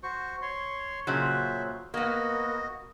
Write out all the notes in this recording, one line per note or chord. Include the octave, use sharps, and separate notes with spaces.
F#4 C5 C#6
C#5 C6
A#2 C#3 F#3 C5 E5
A#3 B3 F#4 D#5